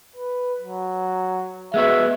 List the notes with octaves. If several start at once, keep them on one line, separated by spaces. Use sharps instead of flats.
B4
F#3
G#3 B3 F#4 E5